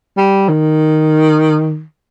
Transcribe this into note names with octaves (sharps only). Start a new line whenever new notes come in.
G3
D#3